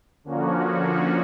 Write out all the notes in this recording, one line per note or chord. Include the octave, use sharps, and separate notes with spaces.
D3 F3 A#3 C#4 F#4